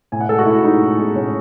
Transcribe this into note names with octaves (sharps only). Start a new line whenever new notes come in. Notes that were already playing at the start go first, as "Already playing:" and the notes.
A2 G#5
F#5
G#3 A4
F#4
A2 E4
G#3 D#4
A2
G#3
A2 C#4